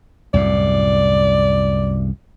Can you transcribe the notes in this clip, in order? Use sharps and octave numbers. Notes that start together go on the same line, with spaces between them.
C2 F#2 A2 D5